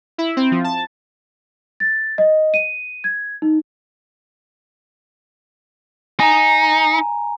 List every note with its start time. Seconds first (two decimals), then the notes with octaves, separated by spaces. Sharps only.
0.18 E4
0.37 C4
0.52 F3
0.64 A5
1.80 A6
2.18 D#5
2.54 D#7
3.04 G#6
3.42 D#4
6.20 D#4 G#5 A#5